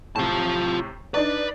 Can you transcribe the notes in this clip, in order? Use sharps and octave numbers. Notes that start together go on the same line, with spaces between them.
A2 C3 F4 A5
D4 D#4 B4 D5